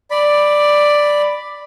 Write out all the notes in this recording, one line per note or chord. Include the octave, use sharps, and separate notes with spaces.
D5 B5